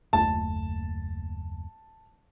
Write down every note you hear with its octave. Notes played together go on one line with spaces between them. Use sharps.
F#1 D#2 A3 A5